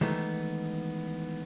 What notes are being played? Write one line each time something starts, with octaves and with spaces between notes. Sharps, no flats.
D#3 E3 G#3 A3 B3